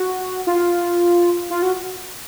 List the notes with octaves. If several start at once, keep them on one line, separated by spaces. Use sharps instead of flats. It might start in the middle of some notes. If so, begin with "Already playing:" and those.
Already playing: F#4
F4
F4
F#4